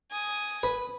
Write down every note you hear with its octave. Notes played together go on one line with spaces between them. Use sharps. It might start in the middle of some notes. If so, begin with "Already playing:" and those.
G#5 D#6
B4